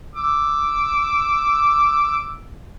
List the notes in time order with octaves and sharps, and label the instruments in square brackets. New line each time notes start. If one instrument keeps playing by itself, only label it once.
[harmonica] D6 E6